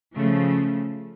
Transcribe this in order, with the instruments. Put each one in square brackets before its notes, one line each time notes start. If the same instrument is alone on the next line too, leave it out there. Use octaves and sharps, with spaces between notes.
[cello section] C#3 F3 A3